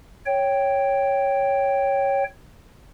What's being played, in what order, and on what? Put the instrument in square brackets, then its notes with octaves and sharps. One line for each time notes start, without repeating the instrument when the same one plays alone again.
[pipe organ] C#5 G5